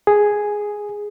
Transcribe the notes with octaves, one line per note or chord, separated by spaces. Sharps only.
G#4